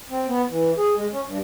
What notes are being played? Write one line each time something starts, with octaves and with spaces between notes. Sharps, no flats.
C4
B3
E3
G#4
G#3
C#4
G2